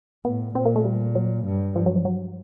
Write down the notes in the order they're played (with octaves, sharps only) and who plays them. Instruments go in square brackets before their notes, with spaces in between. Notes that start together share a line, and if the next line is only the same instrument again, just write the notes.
[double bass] A2 [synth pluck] B3
[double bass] A#2 [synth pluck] C4
[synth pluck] A#3
A3
G3
F#3
[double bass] G2
[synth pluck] F3
F#3
F3
F#3